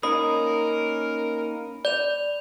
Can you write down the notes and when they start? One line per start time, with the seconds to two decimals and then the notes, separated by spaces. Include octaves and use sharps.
0.03 A#3 C#4 D#4 A#4 B5 D#6
1.85 D5 G6 F7